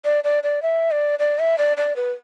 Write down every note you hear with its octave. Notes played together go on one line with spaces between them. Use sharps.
D5
D5
D5
E5
D5
D5
E5
D5
D5
B4